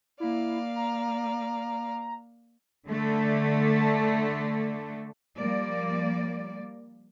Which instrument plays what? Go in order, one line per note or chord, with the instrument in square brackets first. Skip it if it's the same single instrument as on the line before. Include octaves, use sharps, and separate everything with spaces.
[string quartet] A#3 D5 F5 [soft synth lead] E4
[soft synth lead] A#5
[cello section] D3 A3
F3 G3 A#3 D5